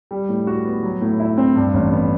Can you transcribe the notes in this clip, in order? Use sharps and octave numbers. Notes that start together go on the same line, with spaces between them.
G3
A2
F#4
B3
F#3
A2
E4
C4
G2
A1
B3